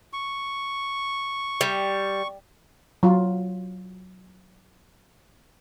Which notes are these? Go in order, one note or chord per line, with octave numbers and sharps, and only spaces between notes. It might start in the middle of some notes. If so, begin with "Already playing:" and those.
C#6
G3
F#3 F4